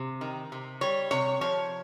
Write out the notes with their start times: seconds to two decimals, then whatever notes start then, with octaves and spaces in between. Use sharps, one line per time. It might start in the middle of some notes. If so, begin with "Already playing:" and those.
Already playing: C3
0.21 D#3
0.52 C3
0.81 G3 C#5
1.11 C3 C#5
1.41 F3 C#5